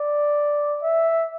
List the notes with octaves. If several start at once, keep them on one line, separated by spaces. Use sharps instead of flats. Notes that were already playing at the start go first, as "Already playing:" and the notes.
Already playing: D5
E5